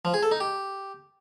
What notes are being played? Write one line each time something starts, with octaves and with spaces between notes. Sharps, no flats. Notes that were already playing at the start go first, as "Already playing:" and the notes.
F3
G#4
A4
D#4
G4